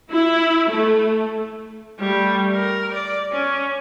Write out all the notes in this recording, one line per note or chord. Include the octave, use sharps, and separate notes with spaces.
E4
A3
G3 A3
A#4
D5
C#4